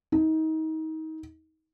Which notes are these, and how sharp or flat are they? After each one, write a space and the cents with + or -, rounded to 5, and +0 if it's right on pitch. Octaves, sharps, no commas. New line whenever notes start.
D#4 +30